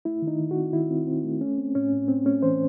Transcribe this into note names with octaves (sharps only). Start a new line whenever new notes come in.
A3 E4
D#3
D#4
D#3
F#4
C4
D#3 E4
C4
C4
A3
A3 C#4
C4
A2 C#4
A2
C4
A3 C#4
E3 C5